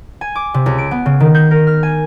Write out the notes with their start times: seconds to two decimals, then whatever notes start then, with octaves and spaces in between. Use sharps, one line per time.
0.21 G#5
0.35 D6
0.54 C3
0.66 C#2
0.78 D7
0.91 B3
1.06 C#3
1.20 D#3
1.34 G6
1.51 A#4
1.67 F6
1.83 G#5